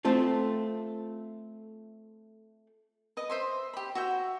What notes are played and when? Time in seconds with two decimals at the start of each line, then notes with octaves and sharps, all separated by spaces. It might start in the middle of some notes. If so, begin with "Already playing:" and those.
0.05 A3 C4 F4 A4
3.17 B4 D#5
3.30 C5 E5 C6
3.73 G4 B5
3.95 F#4 E5 G5